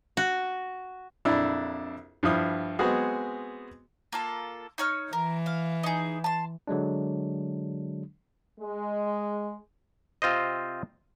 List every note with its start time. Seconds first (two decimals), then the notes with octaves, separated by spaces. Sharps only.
0.17 F#4
1.25 A#1 F2 D4 E4 E6
2.23 G2 F3 E4 D#6
2.79 G#3 B3 C4 F#4 G#4
4.12 A#3 F4 A4
4.78 D#4 C#5 F6
5.13 E3 A#4
5.46 F5
5.83 D#4 G#4
6.24 A5 C6
6.67 D3 F#3 G#3 D4
8.59 G#3
10.22 C3 C4 F4 C5 D#5